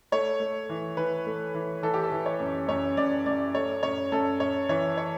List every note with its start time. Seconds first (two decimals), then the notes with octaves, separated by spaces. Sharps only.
0.12 A3 C#5
0.40 A3
0.69 E3
0.97 E3 B4
1.26 A3
1.55 E3
1.83 E3 A4
1.94 G4
2.03 A4
2.12 E3
2.26 C#5
2.40 F#2
2.68 F#2 C#5
2.97 F#2 D5
3.26 F#2 D5
3.54 A3 C#5
3.83 F#2 C#5
4.12 F#2 A4
4.40 F#2 C#5
4.69 E3 C#5
4.97 C#5